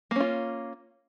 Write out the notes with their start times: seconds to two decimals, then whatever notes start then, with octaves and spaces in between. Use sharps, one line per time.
0.11 A#3
0.16 C#4
0.20 F4